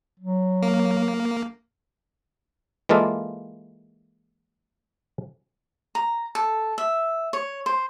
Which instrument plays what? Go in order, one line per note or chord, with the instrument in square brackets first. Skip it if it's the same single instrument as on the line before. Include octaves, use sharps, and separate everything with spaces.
[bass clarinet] F#3
[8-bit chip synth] A#3
[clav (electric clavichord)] E3 G#3 A#3 F4 A4 D5
[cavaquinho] A#5
A4
E5
C#5
C5